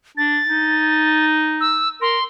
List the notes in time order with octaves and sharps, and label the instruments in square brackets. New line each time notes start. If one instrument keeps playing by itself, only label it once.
[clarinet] D4 [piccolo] A6
[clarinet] D#4
[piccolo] E6
[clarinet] A#4 [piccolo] C6